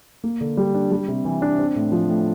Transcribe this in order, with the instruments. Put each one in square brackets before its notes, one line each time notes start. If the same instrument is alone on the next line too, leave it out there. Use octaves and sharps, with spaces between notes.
[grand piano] A#3
D3
G3
D4
G3
C3
E3
D4
C4
A2
F3
A2